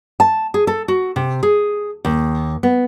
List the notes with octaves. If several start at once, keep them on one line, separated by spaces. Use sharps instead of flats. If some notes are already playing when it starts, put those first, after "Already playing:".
A5
G#4
A4
F#4
C3
G#4
D#2
B3